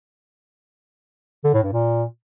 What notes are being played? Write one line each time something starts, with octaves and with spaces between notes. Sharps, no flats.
D3
A2
G2
A#2